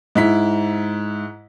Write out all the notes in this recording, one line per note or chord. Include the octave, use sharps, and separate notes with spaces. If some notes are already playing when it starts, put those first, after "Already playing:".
G#2 E4 B6